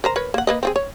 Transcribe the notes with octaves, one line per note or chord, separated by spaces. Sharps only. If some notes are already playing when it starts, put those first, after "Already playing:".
A#4 C5 A#5
A#4 B4 C#5
A#3 F#5
A#3 B4 D#5
C4 F4 G#4
C#5